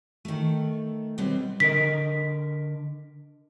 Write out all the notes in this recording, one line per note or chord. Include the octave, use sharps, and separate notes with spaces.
D#3 A3
B2 F#3 G3 B3 C4
D3 A#4 D#5 B6